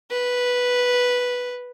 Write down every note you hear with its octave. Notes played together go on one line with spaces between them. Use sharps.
B4